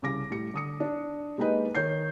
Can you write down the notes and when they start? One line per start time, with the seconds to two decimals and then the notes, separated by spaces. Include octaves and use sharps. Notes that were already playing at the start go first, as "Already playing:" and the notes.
0.02 C2 C#3 D6 A#6
0.30 A2 G3 C#7
0.54 D3 D#6 C#7
0.80 D4
1.38 G#3 A#3 D#4 G4 B4 D#5
1.75 D#3 C#5 G6 C7